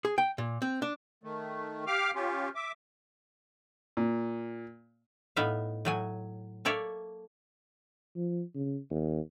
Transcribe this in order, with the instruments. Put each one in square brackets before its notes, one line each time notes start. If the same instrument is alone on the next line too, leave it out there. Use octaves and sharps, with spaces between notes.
[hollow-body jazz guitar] G#4
G5
A#2
C4
D4
[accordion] D#3 A3
G4 F5 D6 F6
C#4 F4 G4
E5 D6
[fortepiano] A#2
[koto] A2 B3 D#4 E5 F5
A2 F#3 G#5
A#3 A4 C#5 D5 E5
[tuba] F3
C#3
D#2